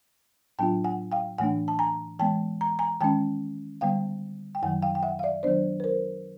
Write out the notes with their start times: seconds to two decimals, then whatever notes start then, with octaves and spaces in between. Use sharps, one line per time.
0.59 A2 F#3 B3 D4 F4 G5 A5
0.84 F#5 G#5
1.12 F5 G5
1.38 A2 E3 A3 D4 F#5 G#5
1.68 A5
1.79 G#5 A#5
2.19 E3 G#3 B3 G5 A5
2.61 A#5
2.79 G#5 A#5
3.01 D#3 G#3 C#4 G5 A5
3.81 D3 G3 B3 F5 G5
4.55 G5
4.62 F#2 D#3 F#3 F#5 G#5
4.82 F5 G5
4.95 G5
5.03 E5 F#5
5.19 F5
5.23 D5 E5
5.43 D#3 F#3 B3 D4 C5 D5
5.80 B4
5.84 A#4 C5